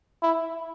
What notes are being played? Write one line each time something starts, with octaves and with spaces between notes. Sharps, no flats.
E4